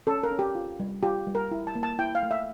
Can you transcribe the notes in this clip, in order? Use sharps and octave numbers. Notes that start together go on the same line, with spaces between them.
C#4 A4
A#4
C#4
G4
F4
G3
F4 G4
G3
A#4
E4
A5
A#3
A5
E4 G5
F5
A3
E5